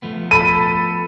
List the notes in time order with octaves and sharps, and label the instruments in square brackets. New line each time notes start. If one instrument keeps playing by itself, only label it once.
[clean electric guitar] F3 A3 B3
[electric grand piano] A4 B5 [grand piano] D#7